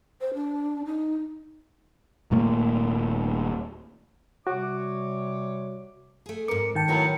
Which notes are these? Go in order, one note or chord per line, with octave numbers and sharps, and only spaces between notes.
C5
D4
D#4
D#1 A#2 A3 A#3
C3 G3 F#4 C#5 D6
A3 G#4
F2 G#2 A#4 D6 C#7
D#3 G5 A5 C#7
A2 F#3 F#4 A#4 B4